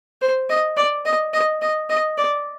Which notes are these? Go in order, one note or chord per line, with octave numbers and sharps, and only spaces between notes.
C5
D#5
D5
D#5
D#5
D#5
D#5
D5